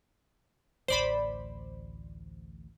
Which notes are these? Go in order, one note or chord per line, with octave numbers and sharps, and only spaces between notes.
A1 D2 C5 D5 B5